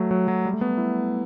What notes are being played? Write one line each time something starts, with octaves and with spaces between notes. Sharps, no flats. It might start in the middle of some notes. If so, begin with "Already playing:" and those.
Already playing: F#3 A3
F#3
F#3
G3
A3
B3
E4